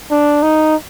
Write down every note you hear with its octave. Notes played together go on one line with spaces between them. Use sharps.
D4
D#4